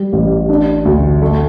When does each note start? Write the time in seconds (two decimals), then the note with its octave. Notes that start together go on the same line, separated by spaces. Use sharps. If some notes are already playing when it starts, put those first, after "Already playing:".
Already playing: G3
0.13 A1
0.49 D4
0.85 D2
1.22 A3